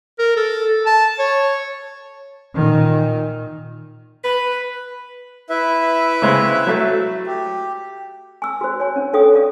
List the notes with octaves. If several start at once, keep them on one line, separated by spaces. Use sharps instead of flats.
A#4
A4
A5
C#5
A#2 D#3
B4
E4 B4 E5
C#3 G#3 C4
F#3 A3
G4
G#5 E6
F#4 C5
C#5 G#5
C#4 D4
D4 A4 C#5 F5 G5 D#6
D5 F5 D#6